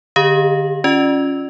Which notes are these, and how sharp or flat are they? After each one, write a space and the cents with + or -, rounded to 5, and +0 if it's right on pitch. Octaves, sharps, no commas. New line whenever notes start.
D3 +30 G4 +0 D#5 +0
C#4 +0 F4 +10 D5 +30